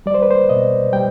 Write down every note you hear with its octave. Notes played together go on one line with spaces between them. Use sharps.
G3 D5
C5
B4
C5
B2 D#5
G3 G5